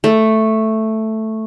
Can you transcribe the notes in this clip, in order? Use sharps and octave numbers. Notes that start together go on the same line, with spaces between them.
A3